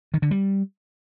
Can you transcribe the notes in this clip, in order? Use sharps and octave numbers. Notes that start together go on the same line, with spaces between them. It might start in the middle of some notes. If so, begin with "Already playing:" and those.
D#3
D3
G3